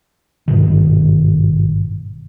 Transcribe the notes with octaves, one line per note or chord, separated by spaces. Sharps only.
G#1 G2 B2 D#3